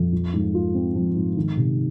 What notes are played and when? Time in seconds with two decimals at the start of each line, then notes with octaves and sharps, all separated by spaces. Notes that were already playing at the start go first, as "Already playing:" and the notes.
Already playing: F2
0.13 F3
0.33 G#2
0.54 F4
0.74 C4
0.95 F3
1.15 G#2
1.36 D#3
1.57 C3